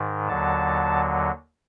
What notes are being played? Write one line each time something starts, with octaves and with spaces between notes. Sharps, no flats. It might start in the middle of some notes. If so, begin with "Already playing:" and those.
Already playing: G#2 D#3
D#2 D3 F#3 A5